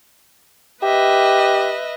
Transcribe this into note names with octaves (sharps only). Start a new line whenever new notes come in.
G4 B4 D#5 E5